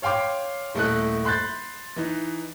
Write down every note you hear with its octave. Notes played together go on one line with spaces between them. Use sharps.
C#5 F5 G5 C6 D6
D#1 A3 E4 A4 D#5 F#6
B5 C6 F#6 G6 A6
E3 D#4